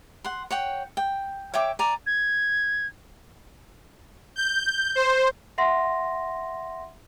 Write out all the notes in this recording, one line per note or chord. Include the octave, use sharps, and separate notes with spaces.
F#5 C6
C#5 F#5 G5
G5
C#5 E5 G5 D6
D5 G#5 A#5
G#6
G6
C5
E5 F#5 C6 A#6